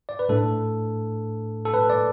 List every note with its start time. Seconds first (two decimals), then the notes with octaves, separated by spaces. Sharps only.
0.09 D5
0.19 B4
0.29 A2 A3 D4 A4
1.65 A4
1.74 B4
1.90 D5